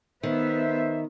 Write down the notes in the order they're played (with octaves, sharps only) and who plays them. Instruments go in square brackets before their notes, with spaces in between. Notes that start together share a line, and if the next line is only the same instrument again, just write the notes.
[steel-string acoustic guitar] D#3 [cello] B3 [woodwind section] B4 C5 E5